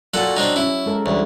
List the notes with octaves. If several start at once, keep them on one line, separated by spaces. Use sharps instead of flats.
A#2 F#3 F#4 A4 F#5
C4 D4 D#4
C#4 E4
G#3 A4 A#4
D2 E3 G3 C#5